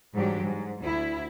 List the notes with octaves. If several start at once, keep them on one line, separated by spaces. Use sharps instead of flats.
G#2 E3 F#3 G3 D4 G4
G#2
D2 E4